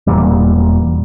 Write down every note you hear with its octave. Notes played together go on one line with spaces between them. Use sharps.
E1 E2 A#2 G3